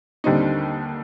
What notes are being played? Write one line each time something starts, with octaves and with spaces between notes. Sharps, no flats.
D#2 D3 G3 C4 D#4